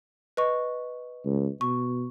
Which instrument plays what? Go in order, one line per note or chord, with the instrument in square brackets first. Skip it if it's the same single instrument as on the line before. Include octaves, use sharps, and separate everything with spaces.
[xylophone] B4 D#5 C#6
[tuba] C#2
[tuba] B2 [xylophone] C#6